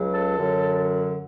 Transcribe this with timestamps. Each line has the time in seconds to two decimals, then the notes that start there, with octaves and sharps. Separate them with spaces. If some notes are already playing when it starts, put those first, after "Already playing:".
Already playing: C#2 C#3 F#3
0.12 A4
0.38 F#2 D3 F#3